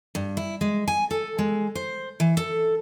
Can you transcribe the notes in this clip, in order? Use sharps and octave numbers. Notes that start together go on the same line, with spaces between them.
G2
E4
G#3
G#5
A4
G#3
C5
E3
A4